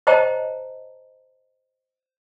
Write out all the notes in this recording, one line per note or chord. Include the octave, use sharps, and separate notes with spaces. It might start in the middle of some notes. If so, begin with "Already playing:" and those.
C5 C#5 D#5 G5 A5 A#5